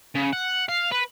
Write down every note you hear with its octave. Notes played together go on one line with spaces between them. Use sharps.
C#3
F#5
F5
B4